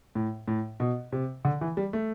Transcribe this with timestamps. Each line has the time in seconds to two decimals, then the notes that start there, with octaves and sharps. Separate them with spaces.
0.15 A2
0.48 A2
0.80 B2
1.12 C3
1.45 D3
1.61 E3
1.77 G3
1.93 A3